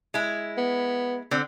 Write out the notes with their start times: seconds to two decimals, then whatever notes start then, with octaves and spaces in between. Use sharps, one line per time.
0.14 G#3 E4
0.57 B3
1.31 D3 C4